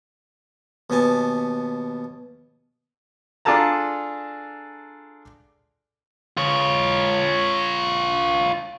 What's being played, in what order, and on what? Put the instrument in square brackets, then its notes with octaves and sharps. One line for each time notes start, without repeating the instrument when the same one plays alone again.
[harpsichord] D#2 B2 B3 G#5 A5
[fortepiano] D4 F4 G#4 A4 A5 A#5
[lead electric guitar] F4 C#5